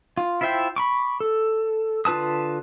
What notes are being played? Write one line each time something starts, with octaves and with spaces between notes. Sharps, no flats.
F4
E4 F4 C5 E5 G5
B5 C#6 D6
A4
D3 F4 B4 A5 D#6